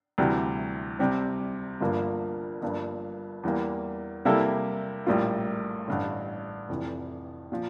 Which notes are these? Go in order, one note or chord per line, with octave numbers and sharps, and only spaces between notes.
D2 C3 E3 G3
C2 C3 G3 C4
G1 G2 D3 F3 A#3
G1 G2 F3 A#3
E2 E3 G3 A#3
C3 G3 A#3 E4 A4
A#1 A2 G3 A#3 F4
A1 G2 D3
F1 F2 C3 E3
A#2 F3